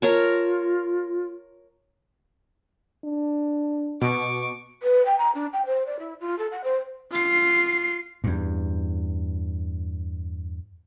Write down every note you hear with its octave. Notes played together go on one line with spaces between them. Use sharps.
F4 A#4 C#5 A5
D4
B2 C#6 D6
B4
G5
A#5
D4
G5
C5
D5
E4
F4
A4
F#5
C5
F4 C7
E2 G2